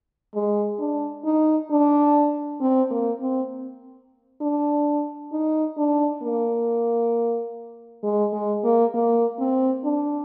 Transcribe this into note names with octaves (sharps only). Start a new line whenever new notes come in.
G#3
D4
D#4
D4
C4
A#3
C4
D4
D#4
D4
A#3
G#3
G#3
A#3
A#3
C4
D4